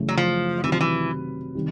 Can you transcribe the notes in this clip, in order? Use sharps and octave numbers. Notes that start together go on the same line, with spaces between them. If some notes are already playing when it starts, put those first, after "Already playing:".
Already playing: F#1 F#2 C#3 E3 A3
F#3
F3
C3 D#3 E3 F#3
F3
E3
C3 D#3 G3